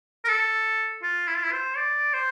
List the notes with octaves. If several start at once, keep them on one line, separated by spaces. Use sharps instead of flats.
A#4
A4
F4
E4
F4
E4
C5
D5
C5